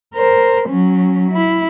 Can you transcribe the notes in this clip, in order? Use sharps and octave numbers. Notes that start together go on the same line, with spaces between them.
A#4 C5
F#3 C#4
E4